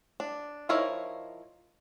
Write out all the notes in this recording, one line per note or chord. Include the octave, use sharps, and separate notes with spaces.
D4
F3 D#4 E4 A#4 C#5